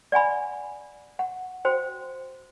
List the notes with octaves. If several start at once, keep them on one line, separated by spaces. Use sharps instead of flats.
D5 F#5 G#5 B5
F#5
F#4 C5 G5